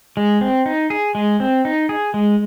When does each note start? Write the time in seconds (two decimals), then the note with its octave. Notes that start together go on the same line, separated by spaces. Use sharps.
0.17 G#3
0.41 C4
0.66 D#4
0.90 G#4
1.15 G#3
1.40 C4
1.65 D#4
1.89 G#4
2.14 G#3